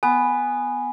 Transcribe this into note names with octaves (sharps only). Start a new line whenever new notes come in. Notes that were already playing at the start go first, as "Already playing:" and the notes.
B3 G#5